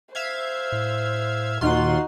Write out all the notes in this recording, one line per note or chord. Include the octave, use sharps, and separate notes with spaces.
C5 E5 F5 G#6
A2
D#2 A#2 D#4 F4 F#4 C6